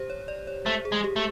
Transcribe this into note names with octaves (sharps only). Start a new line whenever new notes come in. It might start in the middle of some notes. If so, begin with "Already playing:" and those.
Already playing: G4 C5
C#5
D5
C#5
A3 C5
G#4
G#3
G4
A3